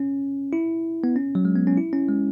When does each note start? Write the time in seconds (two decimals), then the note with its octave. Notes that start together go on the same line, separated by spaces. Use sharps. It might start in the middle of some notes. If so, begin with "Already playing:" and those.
Already playing: C#4
0.53 E4
1.04 B3
1.16 C#4
1.35 F#3
1.45 G#3
1.56 B3
1.67 C#4
1.77 E4
1.93 C#4
2.09 G#3